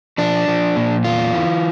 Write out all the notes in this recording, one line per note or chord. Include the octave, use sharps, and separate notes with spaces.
F3 D4
F3
A#2
E2 F4
E3